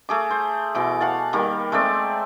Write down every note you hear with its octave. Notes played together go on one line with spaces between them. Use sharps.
A3 G#4 D6
C5
B2 E3 D6
C#5 F5 F#5 A5
D#3 G3 A#3
G#3 A3 C4 D5